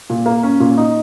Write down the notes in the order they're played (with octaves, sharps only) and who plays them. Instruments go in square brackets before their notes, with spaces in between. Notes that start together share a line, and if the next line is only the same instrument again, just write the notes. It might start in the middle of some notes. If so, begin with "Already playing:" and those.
[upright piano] A#2
A#3
C#4
A#2
D#4